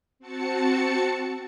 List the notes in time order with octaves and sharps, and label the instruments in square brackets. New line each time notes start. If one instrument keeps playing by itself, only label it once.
[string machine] C4 F#4 A5 C#7